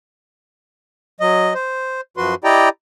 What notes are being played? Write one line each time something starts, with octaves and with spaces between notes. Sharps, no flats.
F#3 D#5
C5
F#2 F3 F#4 B4 C6
E4 G4 D5 D#5 G5 A#5